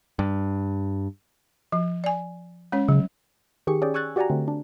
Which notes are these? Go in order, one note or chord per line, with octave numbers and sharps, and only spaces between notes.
G2
F3
D5 G#5
G#3 C#4 C#5
C#3 F#3
D#3 G4 G#4 C#6 C#7
C#4 G#4 D5 G5
G#5 C#6 E6 F#6 G#6 A6
F#4 G4 D5 F#5 G#5 A#5
D3 A3 C4
D4